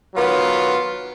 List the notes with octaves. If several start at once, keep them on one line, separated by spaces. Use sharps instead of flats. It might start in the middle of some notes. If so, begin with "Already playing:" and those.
D#3 F#3 B3 F4